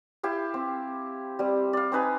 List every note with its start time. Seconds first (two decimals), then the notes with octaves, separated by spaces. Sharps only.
0.23 E4 G4 F5
0.54 C4
1.39 G3 C4
1.73 D5 F5
1.92 C4 D#4 B4 G#5